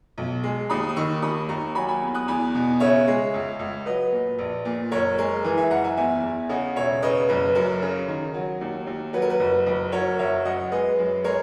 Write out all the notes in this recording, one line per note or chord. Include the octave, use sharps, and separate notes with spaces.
B1
G#3
D#2 B5 D#6
D#6
D#3 C#6 E6
D#2 B5 D#6
D#2 A#5 C#6
F#3 G#5 B5
G#5 B5
E2
D#6 F#6
E2 G#5 B5
B2
C#3 C#5 E5
G#3
C#2
C#2
F#3 B4 D#5
A#2
A#1
A#2
F#1 A#4 C#5
G#3 A#4
E3 B4
E5 G#5
F#1 F#5 A#5
E5 G#5
E2 E5 G#5
E2
C#3 D#5 F#5
E1 C#5 E5
C#3 B4 D#5
F#1 B4
F#2 A#4
C#3
D#3 A#4
F#3
D#2
D#2
F#3 B4
A#4
B4
F#1
F#1
F#3 A#4 C#5
F#1 C#5 E5
F#2 D#5 F#5
G#3 B4 D#5
F#2
G#3 A#4 C#5